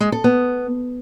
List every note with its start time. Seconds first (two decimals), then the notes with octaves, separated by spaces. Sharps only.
0.01 G#3
0.12 A4
0.24 B3